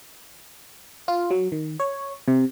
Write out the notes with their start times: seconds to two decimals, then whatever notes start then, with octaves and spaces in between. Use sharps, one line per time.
1.08 F4
1.31 F#3
1.52 D#3
1.80 C#5
2.28 C3